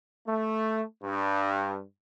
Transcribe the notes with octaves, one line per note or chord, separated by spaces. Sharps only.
A3
G2